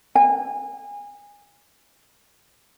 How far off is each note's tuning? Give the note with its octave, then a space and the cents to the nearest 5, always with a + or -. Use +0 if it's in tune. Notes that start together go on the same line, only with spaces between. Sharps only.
G#5 -25